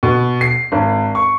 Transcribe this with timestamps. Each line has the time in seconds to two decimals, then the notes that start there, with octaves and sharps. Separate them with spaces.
0.03 B2
0.41 C7
0.72 G#1
1.15 C#6